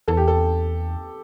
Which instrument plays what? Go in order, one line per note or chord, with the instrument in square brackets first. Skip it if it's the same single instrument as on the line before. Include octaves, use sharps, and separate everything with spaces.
[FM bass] E2 [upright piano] A4
[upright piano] G4
A4